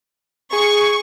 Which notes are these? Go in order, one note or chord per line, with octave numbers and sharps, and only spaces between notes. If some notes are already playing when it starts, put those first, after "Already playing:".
G#4 C#6